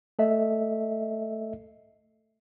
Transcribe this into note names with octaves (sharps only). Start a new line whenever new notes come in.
A3 A4 D#5 E5